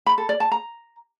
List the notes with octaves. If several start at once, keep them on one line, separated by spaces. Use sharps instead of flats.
B5
A4
D5
A5
A#5